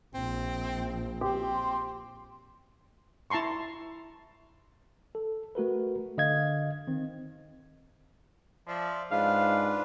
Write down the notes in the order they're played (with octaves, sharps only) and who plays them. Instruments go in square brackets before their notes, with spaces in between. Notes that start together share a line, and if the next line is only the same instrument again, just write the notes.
[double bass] A#1 [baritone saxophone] C4
[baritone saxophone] C4 [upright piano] G4 [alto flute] C6
[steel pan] E4 A5 A#5 C6 C#6
[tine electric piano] A4
A3 F#4 A#4 B4
D3 D#5 F5 G#6
D#3 C4
[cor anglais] F3 [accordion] D5 E5 F5
[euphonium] G#2 [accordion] D4 F4 B4 [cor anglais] F5